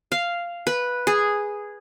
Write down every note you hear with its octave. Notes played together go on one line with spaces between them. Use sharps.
F5
B4
G#4